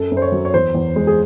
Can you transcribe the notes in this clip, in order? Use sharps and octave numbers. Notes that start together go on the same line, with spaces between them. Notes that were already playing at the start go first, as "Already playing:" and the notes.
Already playing: F#2 A4
F#2
C5
C#5
F#3
C#5
E2 C5
E2
G#3
G#4